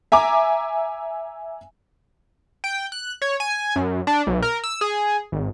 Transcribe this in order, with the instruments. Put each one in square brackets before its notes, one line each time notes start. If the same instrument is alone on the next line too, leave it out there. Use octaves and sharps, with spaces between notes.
[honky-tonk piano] E5 G#5 A#5 D6
[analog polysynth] G5
F#6
C#5
G#5
F#2
D4
B1
A#4
E6
G#4
G#1